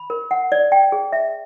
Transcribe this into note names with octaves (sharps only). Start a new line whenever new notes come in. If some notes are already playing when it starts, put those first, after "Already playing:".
Already playing: B5
A#4
F#5
D5
G5
G#4
E5